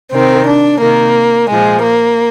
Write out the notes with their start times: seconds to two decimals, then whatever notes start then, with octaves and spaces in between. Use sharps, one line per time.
0.12 C3 D#3 C4
0.46 D4
0.81 C3 D#3 A#3
1.50 A#2 F3 G#3
1.84 A#3